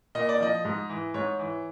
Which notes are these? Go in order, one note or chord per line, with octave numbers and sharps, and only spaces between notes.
A#2 D#5
D5
F3 D#5
G#2
E3
G#2 C#5
E3